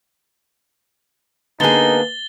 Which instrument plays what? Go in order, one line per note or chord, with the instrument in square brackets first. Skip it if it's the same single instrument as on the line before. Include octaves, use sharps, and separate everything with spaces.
[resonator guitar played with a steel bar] D3 G#4 [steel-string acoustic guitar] A#3 B3 [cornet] D#4 [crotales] A6 G7